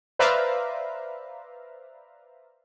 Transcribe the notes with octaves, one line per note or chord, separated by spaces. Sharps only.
B4 C5 D5 E5 F5 A#5